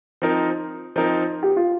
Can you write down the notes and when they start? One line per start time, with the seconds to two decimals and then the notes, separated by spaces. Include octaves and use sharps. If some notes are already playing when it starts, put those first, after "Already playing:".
0.22 F3 C4 D#4 A#4
0.96 F3 C4 D#4 A#4
1.43 G4
1.57 F4